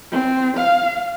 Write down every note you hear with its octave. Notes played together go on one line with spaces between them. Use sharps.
C4
F5